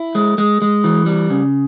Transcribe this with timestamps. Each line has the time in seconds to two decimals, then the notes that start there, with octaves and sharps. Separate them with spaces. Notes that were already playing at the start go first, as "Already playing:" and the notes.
Already playing: E4
0.15 G#3
0.38 G#3
0.62 G#3
0.84 E3
1.06 G3
1.30 C#3